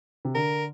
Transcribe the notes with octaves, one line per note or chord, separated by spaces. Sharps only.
C3
D3 A#4